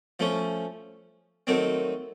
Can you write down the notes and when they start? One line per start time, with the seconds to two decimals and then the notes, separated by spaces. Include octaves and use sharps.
0.19 F3 A3 C#4
1.47 D#3 F#3 A3 C4